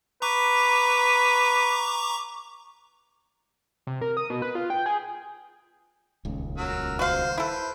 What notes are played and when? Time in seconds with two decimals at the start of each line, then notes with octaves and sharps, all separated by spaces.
0.22 B4 A#5 C#6 D6
3.87 C3
4.01 A#4
4.17 D#6
4.30 B2
4.42 B4
4.55 F4
4.70 G5
4.86 G#4
6.25 D#1 C#2
6.58 F#3 A#4 E6
6.99 F#4 C5 F5
7.38 E4 A4 B4 C5